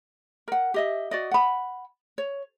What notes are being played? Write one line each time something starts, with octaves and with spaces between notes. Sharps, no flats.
A#4 F#5
G4 D#5 E5
F#4 D5 D#5
F#5 B5
C#5